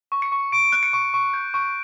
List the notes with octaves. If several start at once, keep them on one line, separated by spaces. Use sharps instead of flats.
C#6
C#7
C#6
C#6 D7
F#6
C#7
C#6
C#6
G6
C#6